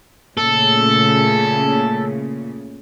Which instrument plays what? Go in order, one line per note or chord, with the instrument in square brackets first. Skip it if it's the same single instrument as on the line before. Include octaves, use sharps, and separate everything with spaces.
[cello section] A#2 C#3 A3 [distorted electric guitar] A4